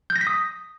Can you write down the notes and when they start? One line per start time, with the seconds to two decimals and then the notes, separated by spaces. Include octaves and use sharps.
0.10 G6
0.16 A#6
0.21 B6
0.27 D#6